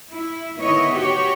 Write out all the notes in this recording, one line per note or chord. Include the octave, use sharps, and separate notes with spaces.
E4
D3 D#3 B3 E4 C#5 D#5
F#4 G4 C#5